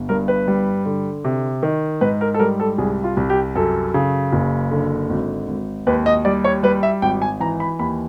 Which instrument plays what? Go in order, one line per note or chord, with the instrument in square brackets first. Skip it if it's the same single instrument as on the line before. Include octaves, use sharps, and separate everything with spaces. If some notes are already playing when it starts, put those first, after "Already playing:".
Already playing: [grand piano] G1
G2 A#4
B4
G3
D3
C3
D#3
G#2 B4
A#4
A4
G3 A#4
A4
C2 G#4
F4
C2
G4
F#2 A4
C#3
F#1
D3
G#1
G#1
D#2 B4
D#5
G3 D5
C#5
G3 B4
E5
G#1 G5
G#5
E3 A#5
B5
D#2 B5